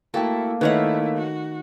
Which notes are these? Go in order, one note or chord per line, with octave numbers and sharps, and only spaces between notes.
A3 A#3 E4 F#4 A4 G5
D#3 A3 E4 B4 C#5 D#5 F5 F#5
F#4